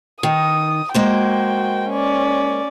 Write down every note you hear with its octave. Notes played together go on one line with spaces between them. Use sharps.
D#3 D#6
G#3 A#3 F#4 C5 G5
C#4 D5